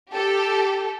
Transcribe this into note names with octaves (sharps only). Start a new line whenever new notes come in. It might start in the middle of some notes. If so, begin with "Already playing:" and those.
G4 A4